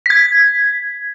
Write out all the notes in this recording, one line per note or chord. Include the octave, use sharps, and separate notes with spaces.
G#6 B6